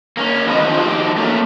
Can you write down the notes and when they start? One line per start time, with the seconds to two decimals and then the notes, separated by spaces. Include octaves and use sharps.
0.17 A#3 C4 C#4
0.46 F2 C4 B4 D#5
0.59 D#3 F3 D4 F4 B4 C5
0.76 F3 D4 D#4 F#4 G4
1.16 A3 A#3 C#4